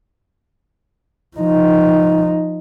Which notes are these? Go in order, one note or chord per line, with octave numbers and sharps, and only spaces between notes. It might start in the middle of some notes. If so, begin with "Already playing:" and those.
F3 D#4